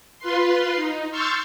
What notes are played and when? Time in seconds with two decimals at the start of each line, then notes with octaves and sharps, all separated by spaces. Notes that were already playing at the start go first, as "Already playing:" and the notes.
0.19 F4 B4 C6
0.76 D#4
1.11 C6 C#6 E6 F6 G6 A6